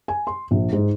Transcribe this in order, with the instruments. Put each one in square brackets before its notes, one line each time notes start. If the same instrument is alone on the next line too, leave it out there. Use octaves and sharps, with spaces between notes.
[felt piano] G#5
C6
A#1
G#2